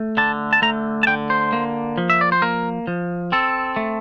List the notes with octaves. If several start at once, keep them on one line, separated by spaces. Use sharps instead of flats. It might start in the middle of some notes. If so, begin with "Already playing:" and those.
Already playing: A3
D3 A5
A5
A3 A#5
A5
D3 G5
C5
A#3
F3
E5
D5
C5
A#3 A#4
F3
C4 A4
A3